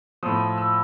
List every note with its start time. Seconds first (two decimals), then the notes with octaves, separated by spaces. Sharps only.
0.23 A2 F3 D#6
0.58 E6